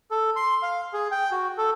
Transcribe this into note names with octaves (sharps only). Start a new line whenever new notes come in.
A4
C6
F5
G#4
G5
F#4
A4